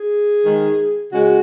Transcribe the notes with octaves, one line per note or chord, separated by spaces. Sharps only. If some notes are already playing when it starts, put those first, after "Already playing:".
Already playing: G#4
D#3 G#3
C#3 G#3 F#4